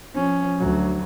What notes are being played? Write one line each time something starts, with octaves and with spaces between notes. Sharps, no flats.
F3 C#4
D2 F#3